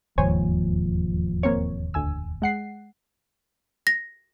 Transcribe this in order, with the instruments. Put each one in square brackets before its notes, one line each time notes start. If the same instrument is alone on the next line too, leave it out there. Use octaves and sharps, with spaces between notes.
[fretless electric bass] E1 D#2 G#2 [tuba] F3 [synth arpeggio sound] C5 C#5 G#5
[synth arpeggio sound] A#3 C4 C#5
D2 G#5 E6
G#3 F#5 C7
[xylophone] A#6